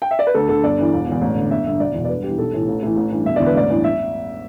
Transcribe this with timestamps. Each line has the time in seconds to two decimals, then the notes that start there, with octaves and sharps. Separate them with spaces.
0.02 G5
0.11 E5
0.19 D5
0.27 B4
0.34 D2 A4
0.49 D3 A4
0.64 G1 D5
0.78 G2 E3
0.93 E1
1.07 E2 E3
1.21 A1
1.36 G2 D3
1.51 G1 E5
1.65 G2 D3 E5
1.80 E1 D5
1.95 E2 B2
2.05 D5
2.09 G1 B4
2.23 G2 E3 G4
2.38 B1 A4
2.53 A2 E3
2.68 A1
2.83 A2 E3
2.96 A1
3.12 G2 E3
3.25 E1 E5
3.36 E2 D3 D5
3.46 B4
3.55 A1 D5
3.70 G2 E3
3.84 E5